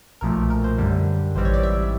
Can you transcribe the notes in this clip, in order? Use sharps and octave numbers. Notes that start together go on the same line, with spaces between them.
B1 A#2 F3 A3 A#4
A#4
C5
F#2 D3 G3
A1 G#2 E3 G3 C4 C5
C#5
D5
E5